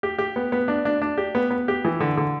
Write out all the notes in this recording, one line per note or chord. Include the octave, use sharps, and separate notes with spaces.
G4
G4
B3
B3
D4
D4
D4
G4
B3
B3
G4
E3
D3
D3